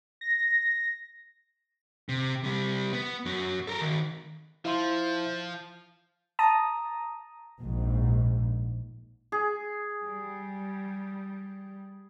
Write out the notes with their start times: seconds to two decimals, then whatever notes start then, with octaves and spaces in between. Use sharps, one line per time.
0.21 A#6
2.09 C3
2.44 C3 G3
2.93 B3
3.25 F#2 F#3
3.67 A4 A#4
3.81 D#3 F#4
4.65 F3 E4 E5 C6
6.39 A5 A#5 D#6
7.61 A#1 G#2
9.32 G#4
10.05 G3